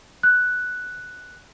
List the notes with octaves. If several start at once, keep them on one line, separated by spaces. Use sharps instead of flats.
F#6